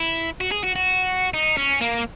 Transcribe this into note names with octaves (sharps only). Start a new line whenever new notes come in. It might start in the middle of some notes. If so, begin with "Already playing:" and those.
Already playing: E4
F#4
G#4
F#4
F#4
D#4
C#4
A#3